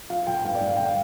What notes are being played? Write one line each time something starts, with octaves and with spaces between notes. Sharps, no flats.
F3 F5
F2 G5
G5
G2 F5
D5
G2
F5
D3 G5
F5